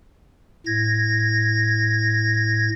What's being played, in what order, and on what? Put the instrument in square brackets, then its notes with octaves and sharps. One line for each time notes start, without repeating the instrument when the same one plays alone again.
[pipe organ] A2 G#6 A#6